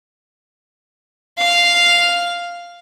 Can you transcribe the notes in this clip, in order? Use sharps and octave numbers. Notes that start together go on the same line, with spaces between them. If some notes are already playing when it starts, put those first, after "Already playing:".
F5 F6